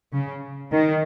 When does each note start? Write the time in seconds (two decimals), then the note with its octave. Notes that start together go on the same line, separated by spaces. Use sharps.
0.13 C#3
0.72 D#3